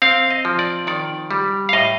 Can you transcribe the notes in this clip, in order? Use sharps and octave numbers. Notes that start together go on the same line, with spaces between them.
C4 F5
D#5
F3
D5
D#3 D5
G3
F5
A2 D#5